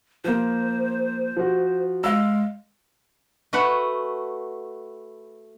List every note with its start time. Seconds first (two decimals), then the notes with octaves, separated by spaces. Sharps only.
0.24 F3 A#3 C5
1.37 F3 F#4
2.04 G#3 F5 E6
3.53 A3 F#4 B4 F#5